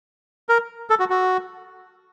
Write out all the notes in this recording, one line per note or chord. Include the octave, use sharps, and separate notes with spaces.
A#4
A4
F#4
F#4